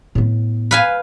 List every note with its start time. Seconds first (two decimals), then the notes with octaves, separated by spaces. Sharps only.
0.15 A2 B3
0.71 B4 F5 G#5